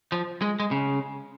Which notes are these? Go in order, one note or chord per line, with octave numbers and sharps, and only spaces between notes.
F3
G#3
G#3
C#3